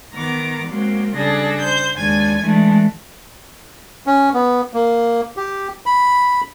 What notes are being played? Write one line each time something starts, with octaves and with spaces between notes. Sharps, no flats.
D#3 B3 A#5 D6
F#3 G#3 A#3 C4
C#3 G3 D4 G#4 A4 A#6
C5 G6
D#2 G#3 D4 G#5 G#6
E3 G#3 A3 D4
C#4
B3
A#3
G4
B5